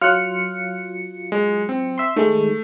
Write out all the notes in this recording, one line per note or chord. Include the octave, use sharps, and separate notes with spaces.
F#3 F4 F6 F#6 C#7
G#3
C4
E5 C6
D#3 G#3 A3